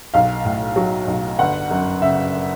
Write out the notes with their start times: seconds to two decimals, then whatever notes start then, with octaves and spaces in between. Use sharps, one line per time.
0.14 B1 F5
0.45 A2
0.76 F#3
1.07 B1
1.38 G1 F#5
1.71 F#2
2.01 C#3 E5